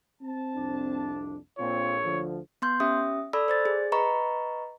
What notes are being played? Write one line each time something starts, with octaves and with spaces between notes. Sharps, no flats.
C4 A5
C2 F2 D4
A#1 A#2 C4 F4 A4 C#5
D2 D3 F3
B3 C6 G6
C#4 G4 E5 D#6
A4 D5 B5 E6
C5 D5 A6
G#4
B4 D#5 A#5 B5 C#6